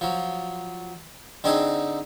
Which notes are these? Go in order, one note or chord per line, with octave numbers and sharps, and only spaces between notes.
F3 F#3
D3 C4 D4 D#4 G#4